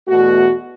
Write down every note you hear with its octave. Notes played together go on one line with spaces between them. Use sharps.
E2 B2 A3 F#4